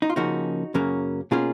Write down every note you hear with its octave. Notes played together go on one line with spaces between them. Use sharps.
D#4
F4
C#3 F3 A#3 C#4 D#4 F#4
F#2 C#3 F#3 A#3 C#4
B2 A#3 C#4 F4 G#4